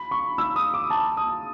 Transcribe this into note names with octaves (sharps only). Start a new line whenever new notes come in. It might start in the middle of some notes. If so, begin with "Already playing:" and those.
Already playing: B5
C#6
E6
D#6
D6
A5
D#6